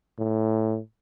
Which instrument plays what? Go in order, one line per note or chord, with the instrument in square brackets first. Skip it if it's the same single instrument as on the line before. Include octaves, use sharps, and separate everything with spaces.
[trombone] A2